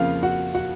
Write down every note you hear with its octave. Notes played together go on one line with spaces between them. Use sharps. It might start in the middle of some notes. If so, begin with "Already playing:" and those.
Already playing: F2 C#3 F3 A#3 F4 F5
F#4 F#5
F#4 F#5